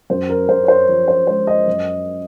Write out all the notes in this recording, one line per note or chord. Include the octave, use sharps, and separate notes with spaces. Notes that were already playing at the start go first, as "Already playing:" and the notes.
F#2 C5
A#4
F#2 C5
C#5
C5
F3
C5
G#3 C5
D#5
F#2